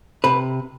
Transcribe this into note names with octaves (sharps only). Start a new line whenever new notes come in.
C3 B4